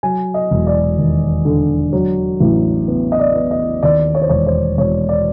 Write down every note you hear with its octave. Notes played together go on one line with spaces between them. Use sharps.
F#3 G#5
D#5
E1
D5
D#2
D3
F#3
A1
B3
D#5
D5
B3
D#5
D#2 D5
C#5
C5
E1 C#5
C5
E1 C#5
D5